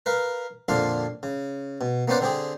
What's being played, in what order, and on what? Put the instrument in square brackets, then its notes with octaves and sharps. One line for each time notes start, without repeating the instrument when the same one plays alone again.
[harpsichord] A#4 B4 F5
F2 A#2 D3 D4 F5 C6
C#3
B2
A#3 B3 C#4 C5 D5 F#5
D3 C4 G4 G#4